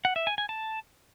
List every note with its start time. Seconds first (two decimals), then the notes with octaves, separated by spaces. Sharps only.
0.05 F#5
0.16 E5
0.27 G#5
0.38 G#5
0.49 A5